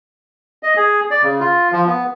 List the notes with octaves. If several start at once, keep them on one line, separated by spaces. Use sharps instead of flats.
D#5
G#4
D5
C#3
F4
F3
B3